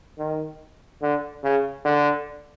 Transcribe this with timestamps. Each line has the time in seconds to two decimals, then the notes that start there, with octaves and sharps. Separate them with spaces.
0.19 D#3
1.02 D3
1.44 C#3
1.85 D3